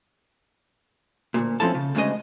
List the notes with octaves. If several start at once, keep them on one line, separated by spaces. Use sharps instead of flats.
D2 A#2
F3 C4 C#4 E4 A4 A5
C#3
D2 G#2 C#3 G#3 C#4 D#5